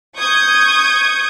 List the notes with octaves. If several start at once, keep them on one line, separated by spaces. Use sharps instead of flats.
C#6 D#6 G6 G#6